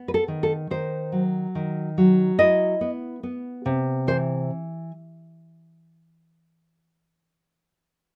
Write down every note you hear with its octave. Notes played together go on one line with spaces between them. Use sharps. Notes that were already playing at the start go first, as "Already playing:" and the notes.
Already playing: B3
B4
A4
D#3
A4
D#3 C5
F#3
D#3
F#3
E4 D#5
B3
B3
C3
E3 C5